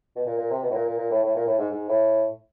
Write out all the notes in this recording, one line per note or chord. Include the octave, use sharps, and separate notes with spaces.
B2
A#2
A#2
C3
B2
A2
A#2
A#2
A#2
A2
A2
A#2
A2
G#2
G#2
A2